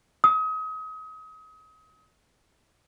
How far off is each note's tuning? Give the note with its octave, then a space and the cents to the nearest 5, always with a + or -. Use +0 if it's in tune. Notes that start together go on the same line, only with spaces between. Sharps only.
D#6 +35